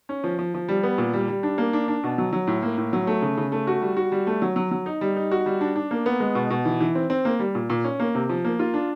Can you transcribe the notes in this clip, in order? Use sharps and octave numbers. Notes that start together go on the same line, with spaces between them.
C#4
F3
F3
F3
G3
B3
A#2
G3
G3
D4
A#3
D4
D4
B2
F#3
F#3
A2
A#3
A2
F#3
A3
C#3
C#3
A3
F#4
G3
F#4
G3
A3
F#3
F#3
F#3
D#4
G3
D#4
F#4
G3
D4
D4
A#3
B3
G#3
B2
B2
E3
E3
C4
C4
A#3
G3
A#2
A#2
C#4
A#3
C3
F3
A#3
F4
D4